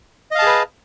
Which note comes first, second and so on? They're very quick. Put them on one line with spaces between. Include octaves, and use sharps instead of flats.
D#5 F5 A5 G#4 B4